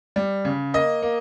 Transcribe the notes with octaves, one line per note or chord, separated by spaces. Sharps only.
G3
C#3
A#3 D#5
A#3